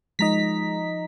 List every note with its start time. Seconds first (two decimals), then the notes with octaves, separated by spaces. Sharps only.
0.19 F3 G#3 D#4 D#5 A#5 B6